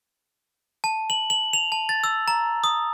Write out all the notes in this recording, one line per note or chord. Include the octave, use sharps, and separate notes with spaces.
A5
F#7
F#7
F7
A5
A6
E6
A#5
D#6